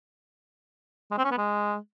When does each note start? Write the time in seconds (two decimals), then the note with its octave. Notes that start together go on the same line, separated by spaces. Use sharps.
1.11 G#3
1.18 C4
1.25 C#4
1.31 B3
1.38 G#3